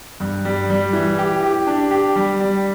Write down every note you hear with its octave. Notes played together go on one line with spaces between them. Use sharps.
G2
G3
G3
E3
G4
G4
D4
G4
G3
G3